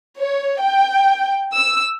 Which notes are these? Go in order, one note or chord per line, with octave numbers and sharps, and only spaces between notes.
C#5
G5
E6